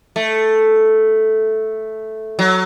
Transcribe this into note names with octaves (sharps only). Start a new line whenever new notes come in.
A3
F#3